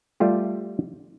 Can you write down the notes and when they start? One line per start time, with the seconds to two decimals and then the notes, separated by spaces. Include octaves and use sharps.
0.20 G3 A3 F4 G4